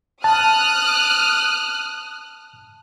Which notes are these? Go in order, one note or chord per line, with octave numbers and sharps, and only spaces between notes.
A5 D#6 F6 F#6